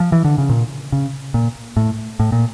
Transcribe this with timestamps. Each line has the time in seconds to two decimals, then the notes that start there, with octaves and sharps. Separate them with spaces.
0.00 F3
0.12 E3
0.25 D3
0.38 C#3
0.49 A#2
0.92 C#3
1.34 A#2
1.77 A2
2.20 A2
2.32 A#2